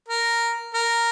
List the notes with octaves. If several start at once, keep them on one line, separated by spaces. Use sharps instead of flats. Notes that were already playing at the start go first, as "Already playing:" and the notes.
A#4
A#4